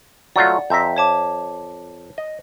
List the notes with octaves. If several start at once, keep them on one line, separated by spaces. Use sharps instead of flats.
F#3 A3 F4 D5 F#5
F2 E5 A#5 G6 B6
C#5 A5 D6
D#5